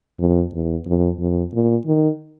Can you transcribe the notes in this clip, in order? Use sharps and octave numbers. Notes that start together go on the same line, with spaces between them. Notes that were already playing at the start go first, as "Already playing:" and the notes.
F2
E2
F2
F2
A#2
D#3